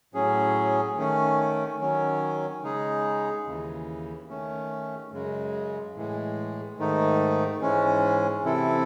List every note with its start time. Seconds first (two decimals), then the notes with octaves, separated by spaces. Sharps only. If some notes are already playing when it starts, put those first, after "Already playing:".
0.14 A2 F#3 C#4 G#4
0.97 D#3 A3 C#4
1.80 D#3 F#3 C#4
2.63 C#3 G#3 D#4 G#4
3.46 D#2 C#3 E3
4.29 D#3 A3 C#4
5.12 F#2 C#3 G#3
5.95 A2 E3 G#3
6.78 G#2 D#3 A3 D#4
7.61 G#2 E3 G#3 C#4
8.44 C3 E3 C4 E4 A4